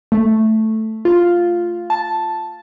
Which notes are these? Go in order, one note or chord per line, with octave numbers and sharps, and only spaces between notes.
A3
F4
A5